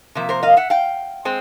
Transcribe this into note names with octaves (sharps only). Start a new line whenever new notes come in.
C3 F3 A#3 E5
A#4 C5
D#5 F5
E5 F#5
F5 G5
G#3 C4